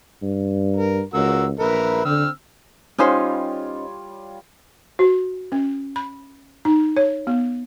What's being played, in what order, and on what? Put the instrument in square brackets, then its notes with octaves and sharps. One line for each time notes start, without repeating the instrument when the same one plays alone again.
[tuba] G2
[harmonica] A#4
[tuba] C#2 [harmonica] F#4 A#4 E6
[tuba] A#1 [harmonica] A#4 B4 E5
[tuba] D3 [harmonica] C4 E6 F6
[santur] G3 F4 C#5 [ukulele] C#4 D#4 C5
[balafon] F#4
C#4
B5
D#4
C#5
B3